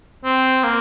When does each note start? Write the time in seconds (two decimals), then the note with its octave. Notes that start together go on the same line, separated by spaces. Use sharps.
0.24 C4
0.64 A#3